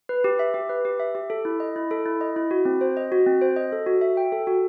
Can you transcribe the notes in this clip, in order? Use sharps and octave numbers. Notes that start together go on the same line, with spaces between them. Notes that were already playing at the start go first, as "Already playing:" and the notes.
B4
G4
E5
G4
B4
G4
E5
G4
A4
E4
D#5
E4
A4
E4
D#5
E4
F#4
C4
C5
D#5
F#4
C4
C5
D#5
A4
F#4
E5
G5
A4
F#4